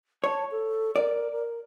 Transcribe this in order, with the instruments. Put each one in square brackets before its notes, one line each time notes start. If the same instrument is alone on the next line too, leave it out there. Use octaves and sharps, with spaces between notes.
[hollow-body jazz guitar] C#5 [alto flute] A5
[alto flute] A4
[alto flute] A#4 [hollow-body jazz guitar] D5
[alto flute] A#4